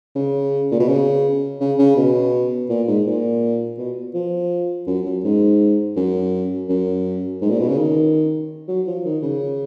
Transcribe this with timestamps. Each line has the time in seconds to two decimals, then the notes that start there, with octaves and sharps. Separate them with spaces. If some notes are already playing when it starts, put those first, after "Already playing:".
0.15 C#3
0.71 A#2
0.79 B2
0.88 C#3
1.60 C#3
1.79 C#3
1.96 B2
2.69 A#2
2.87 G#2
3.06 A#2
3.78 B2
4.14 F3
4.87 F#2
5.05 F#2
5.24 G#2
5.96 F#2
6.69 F#2
7.41 G#2
7.50 A#2
7.59 B2
7.68 C#3
7.78 D#3
8.68 F#3
8.87 F3
9.05 D#3
9.22 C#3